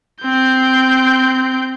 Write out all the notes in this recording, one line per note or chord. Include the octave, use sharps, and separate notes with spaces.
C4 G6